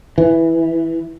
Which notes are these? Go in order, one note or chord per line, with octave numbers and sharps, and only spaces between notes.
E3